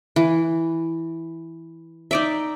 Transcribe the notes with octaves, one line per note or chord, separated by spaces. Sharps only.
E3
D#4 D5 E5